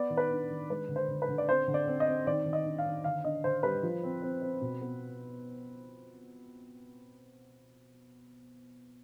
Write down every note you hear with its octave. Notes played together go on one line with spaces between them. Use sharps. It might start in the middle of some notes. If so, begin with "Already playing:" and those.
Already playing: B3 D5
D#3
B4
D4
D#3
G#3 B4
D3
C5
D3
B4
D3
D5
C4 C5
D3
D5
C4
D#5
C4
D#3 D5
D#3
D#5
D4
F5
D#3
D3 F5
D4 D#5
D3 C5
G3 B4
F3
C4
C4
C4
B2
B3